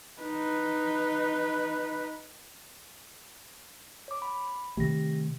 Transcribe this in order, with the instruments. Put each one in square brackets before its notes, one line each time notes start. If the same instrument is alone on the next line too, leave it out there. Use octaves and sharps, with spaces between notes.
[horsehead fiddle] D#4 B4
[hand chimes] C#5 D6
B5
[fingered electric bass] C3 D#3 A3 [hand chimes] G4 A#6